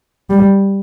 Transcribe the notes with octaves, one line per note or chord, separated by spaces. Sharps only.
G3